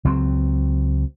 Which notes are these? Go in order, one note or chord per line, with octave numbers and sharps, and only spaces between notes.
C#2 F#3 C4